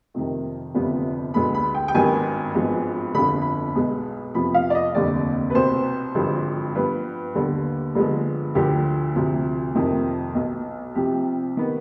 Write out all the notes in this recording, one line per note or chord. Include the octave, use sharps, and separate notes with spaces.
F2 C3 D#3
G1 F2 C3 G3 B3
D2 D3 G#3 B3 B5
B5
G5
G5
G#1 G2 D#3 B3 G#5
G#1 G2 F3 G#3 B3
G1 F2 D3 B5
B5
B1 B2 G#3 B3
F2 C3 F3 B3 B5
F5
D5
D#5
F1 D#2 D3 G3 D5
B4
C2 B2 B3 C5
G#1 G2 D3 F3 G#3
G2 F3 B3 B4
D#2 D3 G3 B3
G2 D3 F3 G#3 B3
D2 D3 F3 G4
D2 C3 F3
F2 C3 D#3
B1 B2 B3
C2 C3 F3 G4
D#3 B3